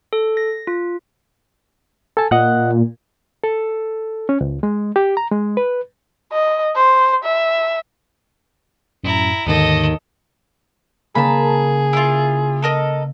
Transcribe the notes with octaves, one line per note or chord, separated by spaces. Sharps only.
A4
A#6
F4
A4 G#5 A5
A#2 D#5 F#5 F#6
A4
C#4
C#2
G#3
G4
A#5
G#3
B4
D#5
C5
E5
F#2 A2 E4 A#5
D#2 G#2 D3 D#3 A4 D#5
C#3 A#3 G#4 A5 B5
E4 F4
A4 A#4 D#5